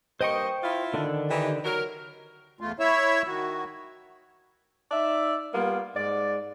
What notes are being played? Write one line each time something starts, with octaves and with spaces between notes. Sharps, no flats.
G2 A#3 C5 D#5 G5 C#6
E4 F4
D3 D#3 D4
E3 D#4 G4
F#3 A#4
E2 A3 F4
E4 C#5 E5 E6
D#3 F#4
D#4 D5 E5
G3 A#3 B3 F4
G#2 D5